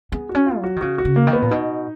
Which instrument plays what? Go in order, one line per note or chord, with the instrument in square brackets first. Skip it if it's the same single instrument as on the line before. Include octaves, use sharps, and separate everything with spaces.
[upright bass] B3 [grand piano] G#4
[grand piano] F#4
[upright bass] C#4
[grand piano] F4
[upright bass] F#3
[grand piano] F#4
[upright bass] D#3
[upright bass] C#3 [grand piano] F#4
[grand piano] F#4
[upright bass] C#3
[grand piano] A#3
[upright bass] D#3
[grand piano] B3
[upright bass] A#2
[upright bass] B2 [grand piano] D#4